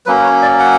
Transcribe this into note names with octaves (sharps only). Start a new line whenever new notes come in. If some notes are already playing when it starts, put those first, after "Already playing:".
F#3 A#3 C#4 B4
C#5
D5
F#5